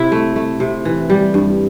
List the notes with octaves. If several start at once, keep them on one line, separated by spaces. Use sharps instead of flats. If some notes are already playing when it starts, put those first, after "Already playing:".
Already playing: C3 E4
A3
A3
C3
E3
G3
G2